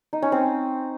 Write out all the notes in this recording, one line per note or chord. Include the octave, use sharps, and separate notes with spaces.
D#4
C#4
C4